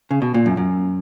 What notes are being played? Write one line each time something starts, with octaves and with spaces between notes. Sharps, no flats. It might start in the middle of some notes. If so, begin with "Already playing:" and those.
C#3
B2
A#2
F#2
F#2